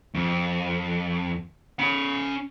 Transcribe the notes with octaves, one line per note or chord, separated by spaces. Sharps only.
F2
C#4 B5